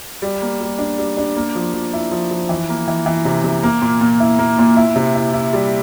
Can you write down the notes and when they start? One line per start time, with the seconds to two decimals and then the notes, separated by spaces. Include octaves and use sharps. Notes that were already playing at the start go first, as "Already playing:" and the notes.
0.22 G3
0.42 A#3
0.60 G3
0.79 D4
0.98 G3
1.17 D4
1.36 A#3
1.55 F3
1.74 F3
1.93 E4
2.12 F3
2.31 F3
2.49 E3
2.69 A#3
2.88 E3
3.06 E3
3.25 C3
3.44 C3
3.63 A#3
3.82 A#2
4.01 A#2
4.20 E4
4.39 A#3
4.59 A#2
4.76 E4
4.96 C3
5.15 E4
5.33 E4
5.53 G3